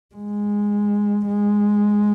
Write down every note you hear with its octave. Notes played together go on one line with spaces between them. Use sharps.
G#3
G#3